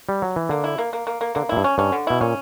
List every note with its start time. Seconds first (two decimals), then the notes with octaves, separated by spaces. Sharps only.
0.09 G3
0.22 F#3
0.36 E3
0.49 D3 A#3
0.64 E4
0.78 A#3
0.93 A#3
1.07 A#3
1.21 A#3
1.35 D3 A#3
1.49 A#2 E4
1.57 G2
1.64 C#4
1.78 G2 C#4
1.92 D3
2.07 B2 E4
2.21 A#2 C#4